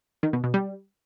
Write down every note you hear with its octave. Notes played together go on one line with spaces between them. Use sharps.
D#3
B2
B2
G3